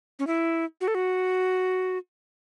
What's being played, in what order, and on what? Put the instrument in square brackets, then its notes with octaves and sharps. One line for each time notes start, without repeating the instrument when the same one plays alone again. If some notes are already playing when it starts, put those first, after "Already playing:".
[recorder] C#4
E4
F#4
A4
F#4